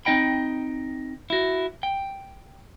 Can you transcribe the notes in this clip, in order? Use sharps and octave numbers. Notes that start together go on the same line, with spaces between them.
C4 D#4 D#5 G5 B5
E4 F#4
G5